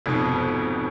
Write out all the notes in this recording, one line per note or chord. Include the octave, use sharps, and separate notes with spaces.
F1 F2 G#2 B2